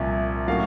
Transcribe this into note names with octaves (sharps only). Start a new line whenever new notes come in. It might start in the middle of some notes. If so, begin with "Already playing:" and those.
Already playing: C2 A#2 F3 E5
A2 F#3 A#3 C#4 F5